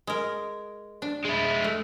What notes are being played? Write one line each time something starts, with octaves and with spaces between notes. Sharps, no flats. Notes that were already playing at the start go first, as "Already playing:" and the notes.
G#3 A#4
D4
G#3 E4
A3